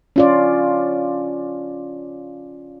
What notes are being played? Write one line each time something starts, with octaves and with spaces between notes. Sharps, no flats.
C#4 F4 D5